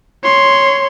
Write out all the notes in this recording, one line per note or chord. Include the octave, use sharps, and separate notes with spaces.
C#5 C6